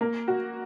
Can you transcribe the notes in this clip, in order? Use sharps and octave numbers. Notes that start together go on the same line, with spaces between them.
A#3
F#4